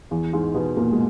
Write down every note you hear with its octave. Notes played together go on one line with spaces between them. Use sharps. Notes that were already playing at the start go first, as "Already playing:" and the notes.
E2 E3
G#2 G#3
B2 B3
A#2 A#3
G#3